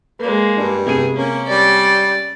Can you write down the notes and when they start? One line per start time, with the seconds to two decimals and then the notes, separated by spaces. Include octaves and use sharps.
0.19 G#3 A#3 B4
0.57 G2 D4 G#4
0.86 C3 B3 G#4 D#7
1.16 A#3 C#4
1.48 G3 D5